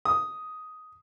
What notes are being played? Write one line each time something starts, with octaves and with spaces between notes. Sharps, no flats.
D#6